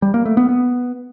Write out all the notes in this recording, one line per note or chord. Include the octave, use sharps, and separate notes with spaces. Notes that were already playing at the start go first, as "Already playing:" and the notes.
G3
A#3
A3
B3
B3